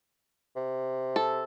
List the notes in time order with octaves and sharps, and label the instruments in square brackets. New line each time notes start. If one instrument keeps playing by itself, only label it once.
[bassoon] C3
[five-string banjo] A4